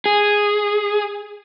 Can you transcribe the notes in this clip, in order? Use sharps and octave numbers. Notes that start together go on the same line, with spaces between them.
G#4